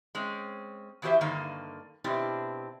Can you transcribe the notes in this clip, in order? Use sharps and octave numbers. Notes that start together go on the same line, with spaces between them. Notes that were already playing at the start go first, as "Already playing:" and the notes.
G#3 C4 C#4
E2 E3 F#4 G4 C5 E5
G2 D3 D#3 A#3 F5
B2 C4 D4 E4 G4